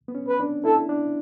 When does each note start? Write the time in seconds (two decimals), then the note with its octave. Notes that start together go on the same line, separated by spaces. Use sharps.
0.08 B3
0.15 C#4
0.28 B4
0.40 D4
0.65 E4 A4
0.89 D4